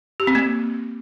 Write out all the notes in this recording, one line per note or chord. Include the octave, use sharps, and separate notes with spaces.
G4
C4
A#3